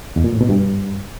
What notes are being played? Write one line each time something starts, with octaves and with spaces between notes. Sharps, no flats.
E2
A#2
A2
B2
G2